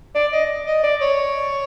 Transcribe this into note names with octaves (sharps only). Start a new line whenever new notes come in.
D5
D#5
D#5
D5
C#5